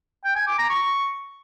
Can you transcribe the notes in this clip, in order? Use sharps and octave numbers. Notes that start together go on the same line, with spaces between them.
G5
G#5
D6
A#5
C#6